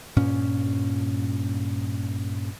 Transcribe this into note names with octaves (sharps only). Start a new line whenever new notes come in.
G2 A#2 C#4